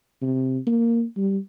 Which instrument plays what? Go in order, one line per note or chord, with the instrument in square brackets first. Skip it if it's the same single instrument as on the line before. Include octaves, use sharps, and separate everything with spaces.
[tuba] C3
A#3
G3